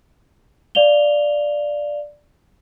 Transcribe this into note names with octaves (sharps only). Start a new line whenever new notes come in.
D5 F5 F7 G7